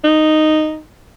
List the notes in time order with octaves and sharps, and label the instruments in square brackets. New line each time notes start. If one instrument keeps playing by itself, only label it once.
[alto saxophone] D#4